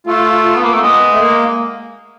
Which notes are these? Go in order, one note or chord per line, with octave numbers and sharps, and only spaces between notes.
A3 F4
B3
A#3
A3
C4
G#3 B3
A3
A#3